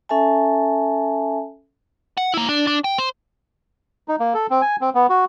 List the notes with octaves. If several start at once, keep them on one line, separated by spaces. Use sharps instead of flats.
C#4 A4 E5 G#5 A5
F#5
A#3 E4
D4
D4
G5
C5
D#4
A#3
A4
C4
G#5
C4
B3
F#4